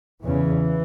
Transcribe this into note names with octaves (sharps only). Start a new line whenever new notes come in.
E2 C#3 E3